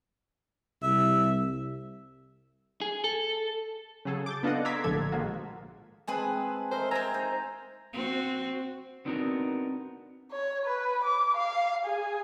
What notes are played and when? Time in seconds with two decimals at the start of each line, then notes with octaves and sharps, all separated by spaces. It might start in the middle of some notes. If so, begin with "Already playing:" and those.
0.83 C2 E5
2.81 G#4
3.04 A4
4.05 C#3 F#3 G#4 A4
4.26 D6 G6 A6
4.43 B3 D4 F4 A4 D#5 F#5
4.65 A#5 C6 D6 E6 G#6 B6
4.84 A#1 A2 D3 F3 A4 G#6
5.12 G#2 D#3 A#3 F4 F#4
6.08 G#3 C4 G#4 B4 G#5 A5
6.72 A#4 C5 D#5 E5
6.91 C4 G#5 A#5 E6
7.14 D#4 C5
7.93 C4 F#4
9.05 B3 C4 D4 D#4 F#4 A#4
10.32 C#5
10.66 B4
11.04 D6
11.37 F5
11.86 G#4